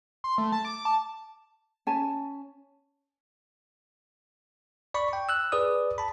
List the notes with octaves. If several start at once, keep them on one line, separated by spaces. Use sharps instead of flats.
C6
A3
A5
D6
A5
C#4 G#5 A5
D5 B5 C#6
G5
E6 F#6
G#4 B4 D5 D#6
A5 B5